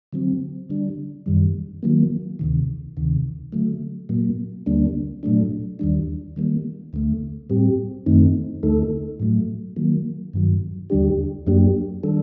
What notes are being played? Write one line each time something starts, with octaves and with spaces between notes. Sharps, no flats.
D3 F#3 C4
D3 G3 D4
F#2 D#3 G3
D#3 F#3 A#3
D2 C3 D#3
D2 C3 D#3
D3 F#3 A3
A#2 F#3 A#3
D2 D3 G3 A#3 D4
A#2 F#3 A3 D4
D#2 D#3 G3 D4
D#3 G3 A#3
D2 D3 A3
A2 G3 C4 G4
F#2 D#3 A3 C4 D#4
D2 D3 A3 D#4 A4
A2 F#3 A3
D#3 F#3 A#3
G2 D#3 F#3
D#2 D3 G3 D4 G4
F#2 F#3 A#3 D4 G4
D#3 G3 D4 A4